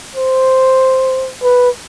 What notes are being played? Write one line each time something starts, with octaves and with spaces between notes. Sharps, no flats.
C5
B4